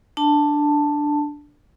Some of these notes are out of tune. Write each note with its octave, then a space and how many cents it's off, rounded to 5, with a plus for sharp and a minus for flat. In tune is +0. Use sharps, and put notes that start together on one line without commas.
D4 +0 A5 +5